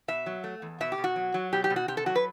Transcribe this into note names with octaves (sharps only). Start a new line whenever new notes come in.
B2 E5
F#3
A3
E2
B2 E5
G4
B2
F#4
F#3
F#3
B2 G4
G4
B2
F#4
C3 G4
A4
F#3 F#4
B4